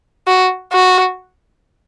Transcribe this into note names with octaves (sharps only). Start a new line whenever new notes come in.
F#4
F#4